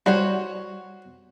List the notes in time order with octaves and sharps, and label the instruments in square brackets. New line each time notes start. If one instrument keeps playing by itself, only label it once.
[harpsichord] G3 [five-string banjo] F#4 C5 C#5